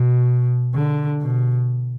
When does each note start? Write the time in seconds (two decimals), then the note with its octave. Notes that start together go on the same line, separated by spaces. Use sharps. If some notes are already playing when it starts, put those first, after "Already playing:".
Already playing: B2
0.74 D3
1.21 B2